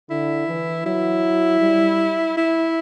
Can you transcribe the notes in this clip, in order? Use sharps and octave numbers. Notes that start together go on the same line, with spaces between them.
D3 E4
E3
F#3 E4
G3
E4